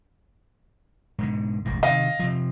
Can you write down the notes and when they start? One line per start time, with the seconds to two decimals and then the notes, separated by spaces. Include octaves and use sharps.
1.19 G#2 B2 D3
1.65 E1 A1 G2
1.83 C3 D#3 D#5 F5
2.19 C3 F3